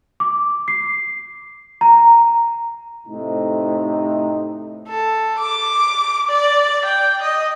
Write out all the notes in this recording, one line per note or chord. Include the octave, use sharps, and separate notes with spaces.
D6
C7
A#5
A2 C3 D#4
A4
D6
D5
G5
D#5